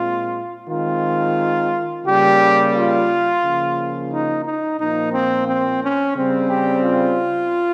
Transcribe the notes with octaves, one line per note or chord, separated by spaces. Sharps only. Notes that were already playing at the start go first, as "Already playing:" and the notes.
Already playing: A#2 G#3 C4 F4
D#3 G#3 C4 F4
C#3 G3 A#3 G4
F4
C#3 F3 A#3
D#4
D#4
A#2 F3 A#3 D#4
C4
C4
C#4
C#3 G3 C4
G4
F4